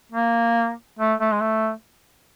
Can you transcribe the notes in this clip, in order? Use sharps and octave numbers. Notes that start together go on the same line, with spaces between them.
A#3
A3
A3
G#3
A3